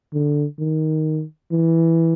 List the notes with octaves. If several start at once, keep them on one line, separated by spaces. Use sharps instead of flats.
D3
D#3
E3